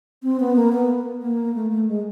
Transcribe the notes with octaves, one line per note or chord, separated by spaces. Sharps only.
C4
B3
A#3
B3
A#3
A3
A3
G#3